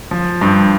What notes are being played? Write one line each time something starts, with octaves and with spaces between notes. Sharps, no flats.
F3
G2